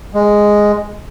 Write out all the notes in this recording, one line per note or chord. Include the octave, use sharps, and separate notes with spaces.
G#3